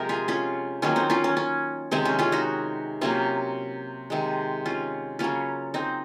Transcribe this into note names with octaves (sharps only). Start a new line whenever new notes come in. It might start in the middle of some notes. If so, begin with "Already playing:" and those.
Already playing: C3 F3 G#3 A#4
F4 G#4
C#4 F4
D#3 F#3 A#3 C#4 F4
C4 D#4
C#4 F4
C#4
C#4
C3 D#3 G#3 C4
C#4
C#4 F4
D#4 F#4
C3 F#3 A#3 C#4 F4
C3 D#3 G#3
C#4 F4
C#3 F#3 A#3 C#4 F4
C4 D#4